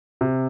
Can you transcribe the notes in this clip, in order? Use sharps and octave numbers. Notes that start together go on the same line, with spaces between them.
C3